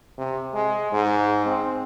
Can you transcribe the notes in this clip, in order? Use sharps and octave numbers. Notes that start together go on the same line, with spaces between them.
C3
G#3
G#2
C4